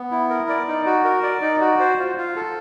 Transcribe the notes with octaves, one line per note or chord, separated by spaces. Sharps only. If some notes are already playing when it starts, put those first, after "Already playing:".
Already playing: B3
E4
A#4
D5
D#4
F#4
A#4
D5
D#4
F#4
C5
F4
F4
A4